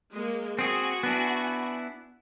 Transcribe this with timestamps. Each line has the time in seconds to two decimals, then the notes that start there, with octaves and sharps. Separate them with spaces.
0.13 G#3 A#3
0.59 C4 F#4 G#4 G#5
1.03 B3 D4 E4